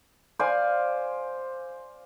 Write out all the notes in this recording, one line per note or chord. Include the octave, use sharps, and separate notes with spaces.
C5 D5 F5 G#5